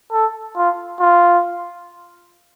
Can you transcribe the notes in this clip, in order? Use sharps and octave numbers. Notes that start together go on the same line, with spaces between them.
A4
F4
F4